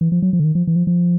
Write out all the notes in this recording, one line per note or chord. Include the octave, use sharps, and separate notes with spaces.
E3
F3
F#3
F3
D3
D#3
F3
E3
F3
F3